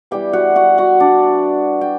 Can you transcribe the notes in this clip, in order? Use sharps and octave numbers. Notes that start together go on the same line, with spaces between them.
E3 G3 B3 G4 G5
F#4 F#5
F#4 F#5
F#4 F#5
D4 D5
G5